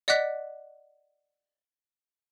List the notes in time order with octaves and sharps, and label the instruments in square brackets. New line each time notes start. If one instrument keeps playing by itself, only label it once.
[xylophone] D5 D#5 F#5 D6 F#6 B6